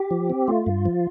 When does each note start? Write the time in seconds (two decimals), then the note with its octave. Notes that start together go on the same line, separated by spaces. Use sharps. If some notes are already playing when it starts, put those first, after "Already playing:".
Already playing: G4
0.11 F3
0.30 C4
0.48 A3 F4
0.66 G2
0.85 F3